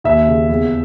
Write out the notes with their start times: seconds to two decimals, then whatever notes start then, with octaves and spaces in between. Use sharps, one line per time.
0.04 D#2 E5
0.27 C#3
0.49 E2